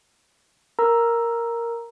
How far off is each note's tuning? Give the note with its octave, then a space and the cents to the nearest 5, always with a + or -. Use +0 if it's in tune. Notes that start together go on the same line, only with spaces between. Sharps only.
A#4 +0 A#5 +5 E6 +0